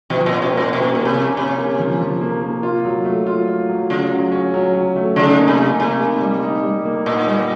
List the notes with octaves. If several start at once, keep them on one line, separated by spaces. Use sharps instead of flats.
B2 F3
A#2 C#4
B2
A#3
A#2
B2 C#4
B2 A#3
C3
A#3
C3 C#4
A#3
F3
F3
A#3
A#3
F4
F#3
A3
F4
F4
F#3
C#3 F4
F#3
C#4
F#3
F#3
A3
C#3 D#4
A#3
C3
A#3
C3 A#3
D#4
G3
D#4
G3
A#3
A#2 D#4
G3